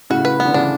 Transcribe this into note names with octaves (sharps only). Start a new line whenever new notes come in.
A2 C#3 F#4
B4
B3
D3
C#3 E3 D4